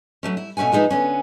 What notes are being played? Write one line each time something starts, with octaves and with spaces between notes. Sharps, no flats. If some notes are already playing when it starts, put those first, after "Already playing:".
F#3 A3 C#4
E4
B2 A3 C#4 F#5 G#5
F3 F#3 G#3 D#4 B4 E5
D3 B3 C#4